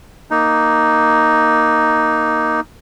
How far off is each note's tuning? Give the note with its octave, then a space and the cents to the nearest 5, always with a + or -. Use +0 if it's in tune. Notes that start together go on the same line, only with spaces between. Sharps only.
A#3 +0 D#4 +0